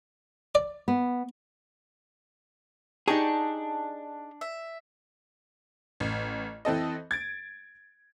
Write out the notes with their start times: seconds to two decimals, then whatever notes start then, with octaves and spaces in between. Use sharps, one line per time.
0.55 D5
0.88 B3
3.08 D4 D#4 G4 G#4 A5 C#6
4.41 E5
6.00 A1
6.65 E3 C4 A4 D#5
7.11 G#6 A6 D7